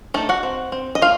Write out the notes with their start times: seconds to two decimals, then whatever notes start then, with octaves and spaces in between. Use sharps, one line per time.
0.14 A3 D#4 A4
0.29 F#4 F#5
0.43 C4
0.72 C4
0.95 D#5
1.02 A3 F4 F5